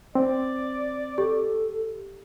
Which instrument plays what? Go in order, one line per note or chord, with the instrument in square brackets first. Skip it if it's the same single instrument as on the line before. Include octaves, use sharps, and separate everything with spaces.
[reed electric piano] C4 [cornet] D5
[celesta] G4 [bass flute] A4